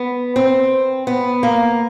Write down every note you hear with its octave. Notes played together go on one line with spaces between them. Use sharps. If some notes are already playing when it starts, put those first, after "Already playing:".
Already playing: B3
C4
B3
A#3